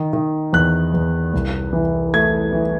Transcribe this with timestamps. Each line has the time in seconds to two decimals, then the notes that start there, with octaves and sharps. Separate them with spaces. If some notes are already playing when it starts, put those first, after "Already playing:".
Already playing: D#3
0.13 D#3
0.53 E2 F#6
0.94 E2
1.34 C2
1.73 E3
2.14 A3 G#6
2.53 E3